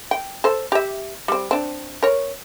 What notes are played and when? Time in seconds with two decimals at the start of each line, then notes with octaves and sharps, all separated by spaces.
0.11 G5
0.44 A4 C5
0.72 G4 E5
1.28 G3 C4
1.51 C4 D4
2.03 A#4 C#5